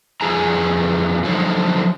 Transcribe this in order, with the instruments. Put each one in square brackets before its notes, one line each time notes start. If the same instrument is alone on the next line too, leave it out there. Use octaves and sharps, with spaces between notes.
[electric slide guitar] F2 E3 F4 G#4 G#5 A#5
D3 F3 F#3 D#4 C5 C#5